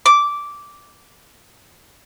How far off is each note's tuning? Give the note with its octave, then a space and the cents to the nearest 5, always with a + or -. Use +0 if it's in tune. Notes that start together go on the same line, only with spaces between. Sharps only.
D6 -10